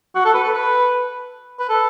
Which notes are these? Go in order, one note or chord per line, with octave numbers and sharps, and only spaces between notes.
F#4
A4
B4
A4
B4
B4
A4